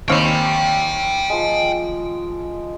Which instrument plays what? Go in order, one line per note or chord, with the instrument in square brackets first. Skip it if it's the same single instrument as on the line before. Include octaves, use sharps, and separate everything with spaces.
[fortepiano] D#2 C4 C#5 [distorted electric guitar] G5 B5 [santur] G#5
[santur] F3 G#3